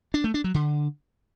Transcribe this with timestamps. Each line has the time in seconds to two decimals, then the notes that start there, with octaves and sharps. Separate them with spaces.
0.14 D4
0.24 A3
0.34 D4
0.44 F#3
0.54 D3